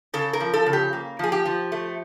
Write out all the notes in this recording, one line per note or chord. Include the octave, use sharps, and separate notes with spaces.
C#3 A4
A#4
F3
A4
C#3
G4
A#3
F3 G#4
G4
F3
A3